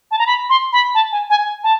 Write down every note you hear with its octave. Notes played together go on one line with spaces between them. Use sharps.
A5
A#5
B5
C6
B5
A5
G#5
G#5
A5